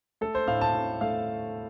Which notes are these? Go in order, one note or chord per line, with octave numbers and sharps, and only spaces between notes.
A3 A4
C5
A2 F5
A5
A2
A3 F5